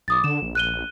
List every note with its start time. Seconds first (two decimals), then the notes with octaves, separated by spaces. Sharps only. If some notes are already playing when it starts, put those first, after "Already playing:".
0.08 B1 D6 D#6 A6
0.24 D3 E7
0.42 A#1
0.55 F#6 D#7 G7